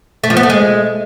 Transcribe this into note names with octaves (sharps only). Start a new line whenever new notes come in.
A3
F3
B3
A3
G#3